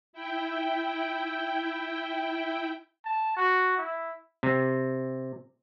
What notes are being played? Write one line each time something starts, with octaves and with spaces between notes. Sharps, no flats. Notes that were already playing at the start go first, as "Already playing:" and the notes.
E4 G5
A5
F#4
E4
C3